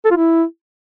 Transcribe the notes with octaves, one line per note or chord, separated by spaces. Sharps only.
A4
F4
E4